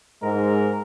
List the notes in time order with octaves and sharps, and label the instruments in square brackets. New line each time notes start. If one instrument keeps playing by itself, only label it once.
[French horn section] G#2 G#3 [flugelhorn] A#4